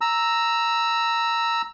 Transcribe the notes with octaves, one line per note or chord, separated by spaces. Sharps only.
A#5 E6